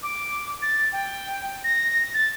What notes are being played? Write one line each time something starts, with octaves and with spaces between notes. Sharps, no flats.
D6
A6
G5
A#6
A6